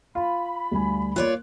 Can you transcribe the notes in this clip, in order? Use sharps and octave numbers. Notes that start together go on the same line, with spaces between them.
F4 B5
D2 G3 G#5
A#3 F4 C#5 D5 F#6